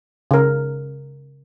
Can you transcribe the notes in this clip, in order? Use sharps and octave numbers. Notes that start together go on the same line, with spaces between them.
C#3 A#4